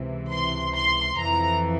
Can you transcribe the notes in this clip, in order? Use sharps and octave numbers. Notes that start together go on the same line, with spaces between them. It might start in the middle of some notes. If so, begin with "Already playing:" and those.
Already playing: C#2 C3 E3
C6
C6
F2 E3 A#5